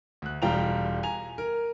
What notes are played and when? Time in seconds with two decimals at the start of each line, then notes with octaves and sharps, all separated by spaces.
0.22 D2 F#6
0.42 E1 G3 F4 G5 A#5 F7
1.03 G#5 A#5 F7
1.38 A#4